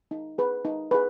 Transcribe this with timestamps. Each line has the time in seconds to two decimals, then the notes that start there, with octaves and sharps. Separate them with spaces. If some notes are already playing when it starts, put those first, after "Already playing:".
0.11 D#4
0.38 G#4 B4
0.65 D#4
0.91 G#4 B4